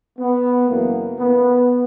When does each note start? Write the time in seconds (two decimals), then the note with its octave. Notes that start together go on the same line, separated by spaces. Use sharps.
0.19 B3
0.69 F#2 C#3 E3 A#3
1.19 B3